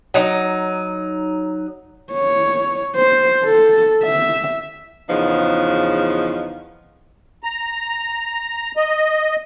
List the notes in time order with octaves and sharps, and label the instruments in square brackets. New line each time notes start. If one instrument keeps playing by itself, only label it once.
[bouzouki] F#3 D#4
[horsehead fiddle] C#5
C5
A4
E5
[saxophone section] E2 C#3 F3 B3 D#4
[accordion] A#5
D#5